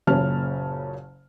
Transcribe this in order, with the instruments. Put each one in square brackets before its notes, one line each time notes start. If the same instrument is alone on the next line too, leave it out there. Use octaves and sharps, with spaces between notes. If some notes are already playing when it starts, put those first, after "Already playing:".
[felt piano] F#1 A#2 C#3 C#4 A5 F6